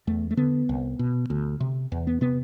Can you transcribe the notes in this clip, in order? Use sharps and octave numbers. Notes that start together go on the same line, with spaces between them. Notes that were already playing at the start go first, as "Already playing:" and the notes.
E2 A3
A3
D3 B3
C2
B2
D2
C3
E2
B3
C3 B3